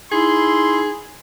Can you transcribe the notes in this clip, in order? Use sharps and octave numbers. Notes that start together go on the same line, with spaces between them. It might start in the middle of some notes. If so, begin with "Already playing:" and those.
D#4 E4 G#4 C6